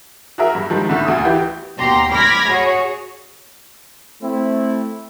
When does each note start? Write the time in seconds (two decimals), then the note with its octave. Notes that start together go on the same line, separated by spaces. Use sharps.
0.38 F#4 G#4 A#4 E5
0.55 G2
0.70 D#3 F3 G3 G#3
0.89 C2 A2 D3 D#3
1.05 D2 D#6
1.25 E3 G4
1.78 D#2 B2 G4 A#5 C6
2.12 B5 D6 F6 G#6 A#6 B6
2.49 F#4 G#4 C#5
4.22 A3 C4 E4